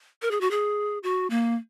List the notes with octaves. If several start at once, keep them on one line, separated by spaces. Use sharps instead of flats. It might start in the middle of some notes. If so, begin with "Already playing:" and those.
A#4
G#4
F#4
G#4
F#4
A#3